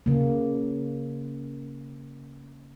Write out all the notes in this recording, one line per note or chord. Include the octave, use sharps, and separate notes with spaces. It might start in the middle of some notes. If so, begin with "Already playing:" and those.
C#3 A#3